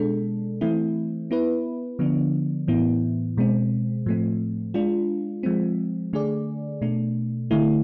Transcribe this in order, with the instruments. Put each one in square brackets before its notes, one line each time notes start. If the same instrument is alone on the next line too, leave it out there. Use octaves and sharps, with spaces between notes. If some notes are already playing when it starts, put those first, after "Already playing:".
Already playing: [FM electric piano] B2 G#3 D4 A4
E3 A3 C4 E4
B3 E4 B4
D3 F3 B3 D4
A2 E3 B3 E4
B2 G#3 C4
A2 F3 A3 C4
G#3 D4 F4
F3 G#3 C4
D3 A3 D4 G#4 D5
B2 A3 D4
D3 A3 E4